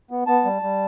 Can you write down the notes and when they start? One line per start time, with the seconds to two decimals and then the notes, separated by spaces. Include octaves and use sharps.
0.11 B3
0.27 B3 A5
0.45 G3
0.62 G3